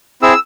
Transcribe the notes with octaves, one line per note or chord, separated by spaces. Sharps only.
C4 E4 G#4 E6